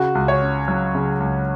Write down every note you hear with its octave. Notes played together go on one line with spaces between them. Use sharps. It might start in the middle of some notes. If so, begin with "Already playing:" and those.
Already playing: C#3 F#4
C#2
C#5
C#4
F#3
C#3
C#2